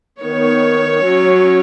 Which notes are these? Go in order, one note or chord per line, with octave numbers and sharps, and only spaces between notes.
D#3 B3 C#5
F#3 C#4